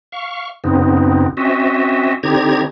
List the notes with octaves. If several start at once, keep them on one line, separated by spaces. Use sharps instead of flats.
F5 C#6
F#2 C#3 B3 C4 D#4
C4 C#4 F#4 D#5 E5
D3 C4 D#4 G4 A#5 G#6